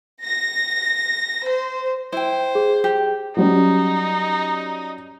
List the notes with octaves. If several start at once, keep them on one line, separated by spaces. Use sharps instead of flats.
A#6
C5
E4 C5 G5
G#4
G4
F#3 G3 C#4 D#4